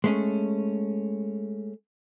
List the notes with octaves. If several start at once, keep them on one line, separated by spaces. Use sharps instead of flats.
G#3 A3 C#4